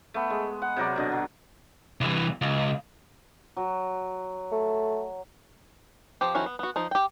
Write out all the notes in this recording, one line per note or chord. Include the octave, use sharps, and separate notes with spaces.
A3 B3
G#3
F#5
C3 F#3 A#4 D5
B2 D3 D#5
F#3
C2 E3
C#2
F#3
A3
F3 C4 G4
D#3 F3 C#4 E4 F#4
B3
B3 F#4
F3 D#4
G4 G5